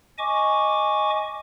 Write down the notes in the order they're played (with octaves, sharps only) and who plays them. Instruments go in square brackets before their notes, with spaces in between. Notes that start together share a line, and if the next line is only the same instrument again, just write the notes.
[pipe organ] D#5 G#5 C#6 D6